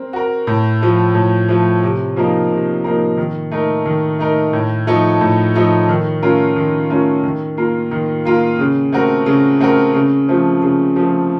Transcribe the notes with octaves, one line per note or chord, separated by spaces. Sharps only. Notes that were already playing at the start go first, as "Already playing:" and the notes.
Already playing: C4 A#4
F#4 A#4
A2
F3 A3
A2
F3 A3
C3
F3 A#3 D#4 A#4
C3
F3 A#3 D#4 A#4
D#3
A3 D#4 A#4
D#3
A3 D#4 A#4
A2
F3 A3 D#4 A4
A2
F3 A3 D#4 A4
D#3
A3 C#4 F4 A#4
D#3
A3 C#4 F4 A#4
D#3
A#3 F4 A#4
D#3
A#3 F4 A#4
C#3
A3 C4 F#4 A#4
C#3
A3 C4 F#4 A#4
C#3
F3 A3 C4
C#3
F3 A3 C4